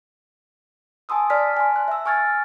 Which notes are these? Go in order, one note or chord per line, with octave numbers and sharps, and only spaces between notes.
G#5 A5 C6 D#6 E6
D5 A5 F6 B6
G#5 A5 C6
A5 F#6
E5 E6
G#5 C#6 F6 G#6 A6